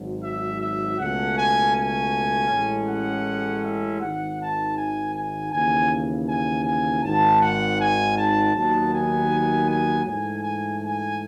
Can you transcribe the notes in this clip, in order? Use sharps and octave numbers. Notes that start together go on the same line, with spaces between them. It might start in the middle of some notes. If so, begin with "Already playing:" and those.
Already playing: G#1 G#2 F#3
E5
E5
C#2 B2 A3 C#4 F#5
G#5
G#5
A1 A2 G#3 C#4
F#5
E5
G#1 G#2 D#3 F#5
A5
G#5
G#5
D#2 C#3 E3 G#5
G#5
G#5
G#1 G#2 D#3 A5
F#5
G#5
A5
D#2 D#3 F#3 B3 A5
G#5
G#5
G#2 E3 A3 G#5
G#5
G#5